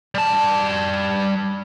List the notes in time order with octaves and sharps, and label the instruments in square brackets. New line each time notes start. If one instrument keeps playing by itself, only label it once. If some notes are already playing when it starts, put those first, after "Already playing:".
[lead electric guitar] G3 A5